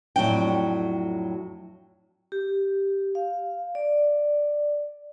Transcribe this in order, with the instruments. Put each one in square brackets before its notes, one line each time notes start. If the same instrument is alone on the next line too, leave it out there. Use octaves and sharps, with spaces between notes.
[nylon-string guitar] F2 A2 F#3 D4 G5
[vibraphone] G4
F5
D5